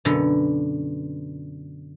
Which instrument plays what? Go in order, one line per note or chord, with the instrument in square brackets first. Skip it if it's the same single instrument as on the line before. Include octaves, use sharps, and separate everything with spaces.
[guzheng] F#2 B2 D3